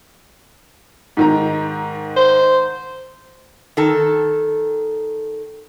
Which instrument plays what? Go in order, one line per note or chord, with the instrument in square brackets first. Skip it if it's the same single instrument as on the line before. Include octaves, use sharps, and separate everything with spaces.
[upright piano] G#2 D#3 A#5
[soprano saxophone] C5
[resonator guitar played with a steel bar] D#3 A4